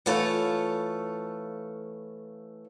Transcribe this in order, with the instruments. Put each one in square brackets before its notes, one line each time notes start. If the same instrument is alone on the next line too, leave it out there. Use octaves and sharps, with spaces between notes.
[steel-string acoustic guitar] E3 A3 F4 A4 C#5